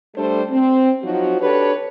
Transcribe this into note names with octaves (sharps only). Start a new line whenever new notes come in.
G3 A3 D4 A4 C5
C4
F3 F#3 D#4 F#4
D4 G4 A4 B4 C#5